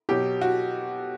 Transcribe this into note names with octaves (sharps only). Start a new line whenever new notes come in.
B2 F#3 G4
F#4